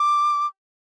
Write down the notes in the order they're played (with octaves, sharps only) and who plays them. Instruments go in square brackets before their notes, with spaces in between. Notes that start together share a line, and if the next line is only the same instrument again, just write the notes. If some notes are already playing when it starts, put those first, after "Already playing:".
Already playing: [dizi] D6